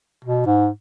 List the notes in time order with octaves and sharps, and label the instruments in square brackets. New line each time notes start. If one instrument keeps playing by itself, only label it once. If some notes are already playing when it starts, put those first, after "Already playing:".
[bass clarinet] B2
G#2